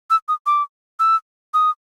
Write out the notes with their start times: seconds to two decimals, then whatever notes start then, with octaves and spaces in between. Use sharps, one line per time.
0.10 E6
0.28 D#6
0.46 D6
1.00 E6
1.54 D#6